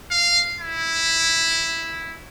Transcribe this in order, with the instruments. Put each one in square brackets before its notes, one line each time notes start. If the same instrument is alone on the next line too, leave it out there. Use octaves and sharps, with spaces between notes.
[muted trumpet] F5
E4